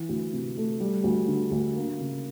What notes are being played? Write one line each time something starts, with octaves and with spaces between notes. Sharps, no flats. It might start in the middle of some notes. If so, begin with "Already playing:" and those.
Already playing: E3
D2
C3
A3
G3
D2
D3
D2
A#3
C#3